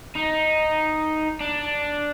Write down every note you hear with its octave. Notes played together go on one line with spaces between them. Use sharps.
D#4
D4